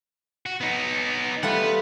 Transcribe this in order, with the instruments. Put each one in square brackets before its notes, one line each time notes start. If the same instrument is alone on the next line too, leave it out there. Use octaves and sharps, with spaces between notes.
[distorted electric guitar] F#4
B3 D#4
[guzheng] G3 A3 F4 [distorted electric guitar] B4 F#5